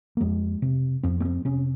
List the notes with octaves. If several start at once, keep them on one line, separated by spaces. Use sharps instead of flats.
A#3
F2 G#3
C3
F2 C4
A#3
C4
C3 C#4